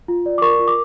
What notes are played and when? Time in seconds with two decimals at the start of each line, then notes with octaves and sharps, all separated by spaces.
0.08 F4
0.26 D5
0.38 D6
0.42 A#4 C#6
0.59 F4
0.68 D6